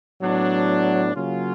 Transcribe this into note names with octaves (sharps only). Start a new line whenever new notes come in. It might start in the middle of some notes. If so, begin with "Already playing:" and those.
A2 F#3 B3 D4
C#3 F#3 A#3 C#4 F4